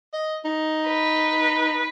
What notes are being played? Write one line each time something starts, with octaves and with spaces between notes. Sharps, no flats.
D#5
D#4
B4